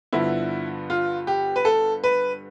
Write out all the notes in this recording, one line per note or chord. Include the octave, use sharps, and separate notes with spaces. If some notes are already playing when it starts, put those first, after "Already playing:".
G2 D3 F3 B3 E4
F4
G4
B4
A4
B4